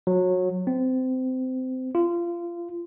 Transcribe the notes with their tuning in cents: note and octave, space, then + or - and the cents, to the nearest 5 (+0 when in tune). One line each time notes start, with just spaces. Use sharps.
F#3 -20
C4 -25
F4 -25